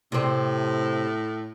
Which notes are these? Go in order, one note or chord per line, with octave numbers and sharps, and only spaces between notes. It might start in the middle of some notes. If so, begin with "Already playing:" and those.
A2 C3 C4